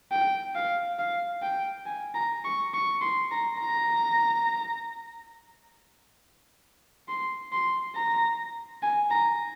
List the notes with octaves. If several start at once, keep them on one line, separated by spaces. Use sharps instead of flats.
G5
F5
F5
G5
G#5
A#5
C#6
C#6
C6
A#5
A#5
C6
C6
A#5
G#5
A#5